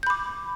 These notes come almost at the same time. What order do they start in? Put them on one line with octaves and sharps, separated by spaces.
G6 B5 D6